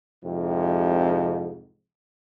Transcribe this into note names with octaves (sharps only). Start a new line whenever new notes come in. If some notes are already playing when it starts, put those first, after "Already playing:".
C2 F2 G#2 C3